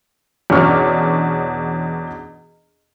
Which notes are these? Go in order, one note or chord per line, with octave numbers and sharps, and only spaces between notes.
E2 B2 C#4 D4 C#6 F6